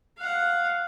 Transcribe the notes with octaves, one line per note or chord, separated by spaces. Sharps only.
F5 F#5